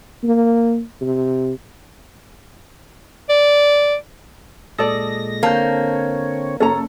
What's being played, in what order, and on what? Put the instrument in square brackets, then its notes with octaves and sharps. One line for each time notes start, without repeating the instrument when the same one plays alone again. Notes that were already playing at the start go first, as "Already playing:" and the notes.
[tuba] A#3
C3
[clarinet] D5
[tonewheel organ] A#2 G#3 A#6 [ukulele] A4 D5 [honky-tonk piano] D#6
[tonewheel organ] D3 C4 C#5 [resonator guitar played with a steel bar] A#3 [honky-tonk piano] A5 G6
[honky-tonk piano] F#1 A4 [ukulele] C#4 A#5